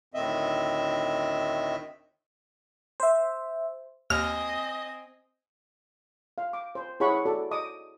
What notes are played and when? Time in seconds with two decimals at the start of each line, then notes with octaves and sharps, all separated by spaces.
0.14 D2 A2 D#3 C4 D#5 E5
3.00 C5 E5
4.10 D#2 C4 D#5 G#5 F6
6.38 F5
6.53 D6
6.75 C5
7.00 E4 G#4 C#5 F#5 B5 C#6
7.25 F#4 A4 D5
7.51 D#5 D6 D#6